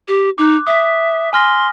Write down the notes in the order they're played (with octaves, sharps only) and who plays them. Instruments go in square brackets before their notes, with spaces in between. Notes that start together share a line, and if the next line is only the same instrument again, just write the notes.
[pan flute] G4
[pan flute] D#4 [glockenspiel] D6 F#6
[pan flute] E5 [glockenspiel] D#6 B6
[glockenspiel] G#5 F6 A#6 [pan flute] C6